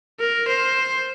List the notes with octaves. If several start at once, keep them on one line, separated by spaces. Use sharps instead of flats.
A#4
C5